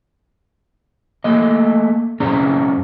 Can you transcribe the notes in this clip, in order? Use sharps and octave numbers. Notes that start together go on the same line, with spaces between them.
A3 A#3 D#5
F#2 C4 C#4 G#4 D5 A#5